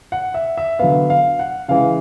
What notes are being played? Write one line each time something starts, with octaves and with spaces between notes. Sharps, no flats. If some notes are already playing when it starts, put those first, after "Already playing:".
F#5
E5
E5
D3 F#3 B3 F5
F5
F#5
C#3 E3 G#3 F5